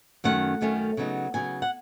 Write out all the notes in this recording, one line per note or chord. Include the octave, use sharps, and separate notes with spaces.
F#2 D#3 A3 C#4 F#5
F#2 D#3 A3 C#4
C#3 F#3 B3 D#4
C#3 F#3 B3 D#4 G#5
F#5